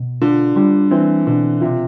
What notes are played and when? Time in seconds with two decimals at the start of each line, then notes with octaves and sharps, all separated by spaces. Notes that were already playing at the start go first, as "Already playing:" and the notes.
Already playing: B2
0.22 D3 F4
0.56 D3 G3
0.91 E3 C4
1.26 B2 D3
1.61 C3 F4